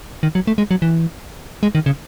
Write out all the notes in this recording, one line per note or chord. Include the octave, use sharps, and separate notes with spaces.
D#3
F#3
A3
G#3
F#3
E3
G#3
D#3
C#3